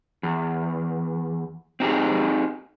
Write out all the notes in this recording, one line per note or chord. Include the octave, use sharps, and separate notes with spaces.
E2
C4 D#4 G4 G#4